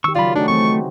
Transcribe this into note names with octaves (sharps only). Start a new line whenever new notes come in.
D#3 G4 C#6 E6
C#3 F#3 F4 D5 B5
A3 D4 D#4 F#4 G#4
E3 C4 C#6